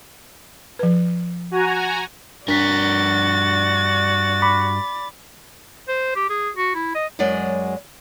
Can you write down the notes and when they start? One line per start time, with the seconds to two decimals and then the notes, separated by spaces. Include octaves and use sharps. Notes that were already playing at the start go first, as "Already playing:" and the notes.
0.79 F3 B4
1.51 F#4 G#5 A#5
2.48 G2 D4 F#4 A#4 D5 A6 B6
4.42 B5 D6 B6
5.88 C5
6.16 G4
6.30 G#4
6.56 F#4
6.75 E4
6.95 D#5
7.19 F#2 F#3 G#3 D5